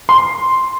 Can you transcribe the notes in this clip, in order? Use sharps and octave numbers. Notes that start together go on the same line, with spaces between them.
C6